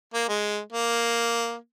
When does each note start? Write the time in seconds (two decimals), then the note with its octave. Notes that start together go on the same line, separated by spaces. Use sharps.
0.14 A#3
0.29 G#3
0.72 A#3